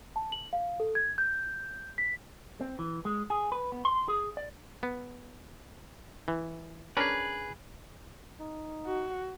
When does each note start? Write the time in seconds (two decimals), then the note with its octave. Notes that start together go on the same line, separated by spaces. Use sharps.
0.16 A5
0.32 F#7
0.53 F5
0.80 A4
0.95 G#6
1.18 G6
1.98 B6
2.61 C4
2.79 E3
3.05 G#3
3.30 G#4
3.52 B4
3.72 B3
3.85 C6
4.08 G#4
4.37 D5
4.83 B3
6.28 E3
6.97 C#4 D4 G#4 A#4 B4
8.40 D#4
8.86 F#4